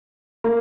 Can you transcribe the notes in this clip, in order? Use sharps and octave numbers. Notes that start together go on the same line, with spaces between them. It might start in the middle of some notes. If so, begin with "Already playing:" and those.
A#3